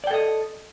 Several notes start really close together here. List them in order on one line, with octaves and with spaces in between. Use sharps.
D5 G5 A4 D#5